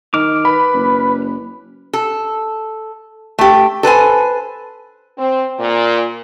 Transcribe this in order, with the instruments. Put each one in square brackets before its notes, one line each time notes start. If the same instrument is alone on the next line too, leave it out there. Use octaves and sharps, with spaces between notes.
[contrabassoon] D#3 [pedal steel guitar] D6 F6
[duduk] B4 [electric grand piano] B5
[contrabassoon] F#1
[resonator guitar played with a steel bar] A4
A3 G4
A4 B4 C5 G#5
[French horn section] C4
A#2